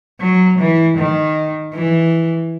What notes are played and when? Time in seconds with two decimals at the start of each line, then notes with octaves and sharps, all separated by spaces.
0.21 F#3
0.59 E3
0.98 D#3
1.74 E3